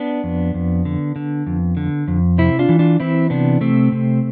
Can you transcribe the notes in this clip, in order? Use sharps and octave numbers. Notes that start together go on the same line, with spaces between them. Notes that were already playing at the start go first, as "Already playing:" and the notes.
Already playing: B3 D4
F2
F2
D3
D3
F2
D3
F2
C3 C4 E4
D4 F4
E3
D4 F4
E3 C4 E4
C3 B3 D4
C3 A3 C4
C3